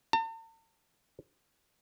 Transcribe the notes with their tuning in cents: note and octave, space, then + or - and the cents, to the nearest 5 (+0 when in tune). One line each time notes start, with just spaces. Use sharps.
A5 +45